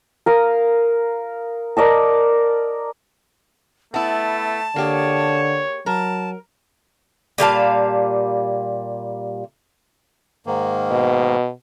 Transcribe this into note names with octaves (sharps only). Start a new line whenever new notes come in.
A#4 F5 D#6
A#4 D5 D#5 A5
A3 B3 E4 A5
D3 A#3 G4 G#4 C#5
F#3 A#4 A5
A#2 G3 F5 A5
G#2 D#3 A#3
B2